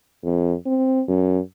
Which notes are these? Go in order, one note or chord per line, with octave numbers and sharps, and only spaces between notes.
F2
C4
F#2